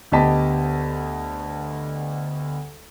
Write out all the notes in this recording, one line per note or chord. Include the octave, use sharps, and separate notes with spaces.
D2 B3 G4 D#5 A5 B6